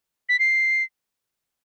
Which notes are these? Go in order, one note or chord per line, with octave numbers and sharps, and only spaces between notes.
B6
C7